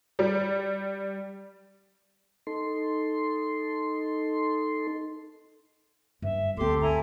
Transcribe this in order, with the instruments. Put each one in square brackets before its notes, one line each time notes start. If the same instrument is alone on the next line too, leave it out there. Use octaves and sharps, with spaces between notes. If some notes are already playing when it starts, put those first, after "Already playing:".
[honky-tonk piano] G3
[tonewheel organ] D#4 A4 C6
[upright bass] G2 [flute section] E5
[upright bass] D2 C4 [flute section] G4 C6 D6 [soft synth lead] A4
[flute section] E4 G#5 A#5